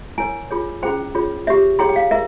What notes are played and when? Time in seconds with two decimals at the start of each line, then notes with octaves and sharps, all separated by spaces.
0.18 E4 A#4 C#5 G#5
0.51 F4 G#4 C#5
0.83 C#4 E4 G#4 C5 G5
1.15 F4 G#4 C#5
1.47 G4 C#5 E5
1.79 E4 G#4 C#5 G5
1.89 G5
1.96 F5
2.11 E4 A#4 E5